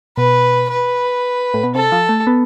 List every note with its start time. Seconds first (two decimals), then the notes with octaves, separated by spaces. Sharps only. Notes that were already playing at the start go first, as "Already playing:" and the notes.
0.17 B2 B4
0.70 B4
1.54 A2
1.63 B2
1.75 C3 A4
1.92 F3
2.09 A3
2.27 B3